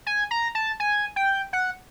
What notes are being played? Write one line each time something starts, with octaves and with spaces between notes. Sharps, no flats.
G#5
A#5
A5
G#5
G5
F#5